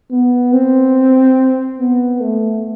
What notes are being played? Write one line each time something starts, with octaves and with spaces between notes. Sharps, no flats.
B3
C4
B3
A3